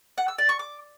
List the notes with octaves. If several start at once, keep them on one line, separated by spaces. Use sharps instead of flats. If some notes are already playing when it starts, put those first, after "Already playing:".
F#5
E6
D5
C#6
D6